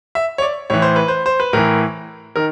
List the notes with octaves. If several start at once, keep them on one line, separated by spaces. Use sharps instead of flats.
E5
C#5
D5
A2 E3 C#5
C5
B4
C5
C5
B4
A2 E3 A#4
D#3 A#4